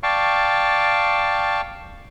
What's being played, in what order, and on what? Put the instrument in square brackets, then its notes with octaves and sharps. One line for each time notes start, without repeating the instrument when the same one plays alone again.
[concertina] D5 F5 G5 A5 C#6